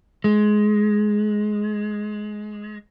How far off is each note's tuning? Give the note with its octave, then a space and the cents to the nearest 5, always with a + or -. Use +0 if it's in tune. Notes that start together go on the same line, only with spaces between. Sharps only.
G#3 +15